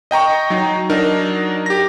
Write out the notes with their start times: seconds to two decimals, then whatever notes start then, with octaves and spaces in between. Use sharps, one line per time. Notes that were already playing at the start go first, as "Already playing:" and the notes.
0.11 D#5 G5 A#5 C#6
0.50 F#3 D#4
0.90 F#3 D4 D#4 A#4
1.66 G4 A#6